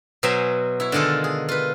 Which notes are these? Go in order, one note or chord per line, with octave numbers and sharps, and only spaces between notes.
B2 F#3 C5 E5 G#5 A#5
E4 C#5
D3 D#3 G#3 F4 A4
G#4
F4 B4